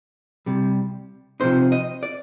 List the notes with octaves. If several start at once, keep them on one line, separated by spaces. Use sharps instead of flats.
C2 C3 G3
C3 F3 C4 D#4 C5
D#5
D5